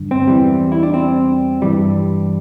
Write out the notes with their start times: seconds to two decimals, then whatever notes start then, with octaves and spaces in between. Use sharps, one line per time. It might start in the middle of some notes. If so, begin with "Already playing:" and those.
Already playing: G2 D3
0.11 C4
0.27 E2 E3 G3
0.72 E4
0.83 D4
0.94 C4
1.62 G2 E3 G3